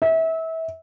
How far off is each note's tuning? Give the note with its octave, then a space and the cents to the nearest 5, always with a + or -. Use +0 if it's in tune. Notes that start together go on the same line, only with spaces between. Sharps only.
E5 -25